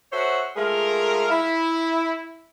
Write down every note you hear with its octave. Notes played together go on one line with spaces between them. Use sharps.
F#4 A4 C5 C#5 E5 F#5
G#3 A3 F4 G#4 A#4
E4